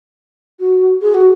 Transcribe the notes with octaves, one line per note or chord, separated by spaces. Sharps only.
F#4
G#4
F#4